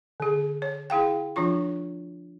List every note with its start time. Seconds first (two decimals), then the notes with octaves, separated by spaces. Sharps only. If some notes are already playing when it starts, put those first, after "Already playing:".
0.20 D3 G#4
0.62 C#5
0.90 E4 G#4 F5 G5
1.36 F3 D4 F4 C#6